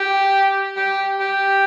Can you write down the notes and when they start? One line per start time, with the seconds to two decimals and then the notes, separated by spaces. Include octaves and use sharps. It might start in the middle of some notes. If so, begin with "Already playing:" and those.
Already playing: G4
0.77 G4
1.19 G4